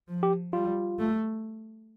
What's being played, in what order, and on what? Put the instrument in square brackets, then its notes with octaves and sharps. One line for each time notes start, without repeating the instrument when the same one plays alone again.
[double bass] F3
[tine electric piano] G4
[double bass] G3 [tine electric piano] F4
[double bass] A3